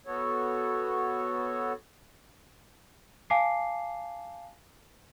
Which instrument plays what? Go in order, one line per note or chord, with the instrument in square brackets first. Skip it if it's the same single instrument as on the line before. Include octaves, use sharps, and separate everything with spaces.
[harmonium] B3 F#4 A4 C#5
[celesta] F5 G#5 A5 D6 C7